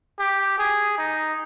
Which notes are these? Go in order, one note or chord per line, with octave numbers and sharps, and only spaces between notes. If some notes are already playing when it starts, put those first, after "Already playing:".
G4
G#4
D#4